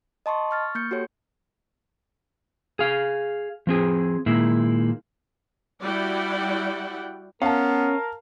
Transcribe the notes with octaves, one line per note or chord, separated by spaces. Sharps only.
D#5 A5 C6 C#6
C#6 F6 A6
A#3 G6 C#7
F#4 G4 A4 C#5
G#4 F5
F3 C4 G#4
A#2 D#3 G#3 A#3 E4
G3 E4 F#4 D5 F#5 G5
B3 C#4 A#4 F5 A5